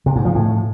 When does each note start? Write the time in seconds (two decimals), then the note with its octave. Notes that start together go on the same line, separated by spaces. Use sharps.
0.06 C3
0.16 G#2
0.25 F3
0.35 A2